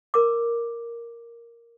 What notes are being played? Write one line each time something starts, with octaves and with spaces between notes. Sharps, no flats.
A#4 D6